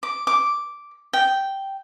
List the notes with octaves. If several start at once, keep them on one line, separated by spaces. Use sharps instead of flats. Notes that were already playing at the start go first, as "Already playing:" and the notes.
D6
D6
G5